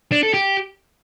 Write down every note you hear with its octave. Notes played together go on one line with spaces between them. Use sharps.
D4
A4
G4